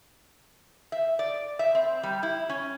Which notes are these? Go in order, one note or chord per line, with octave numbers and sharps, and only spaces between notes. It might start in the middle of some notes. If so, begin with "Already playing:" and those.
E5
D5
E5
C4
G3
E4
C#4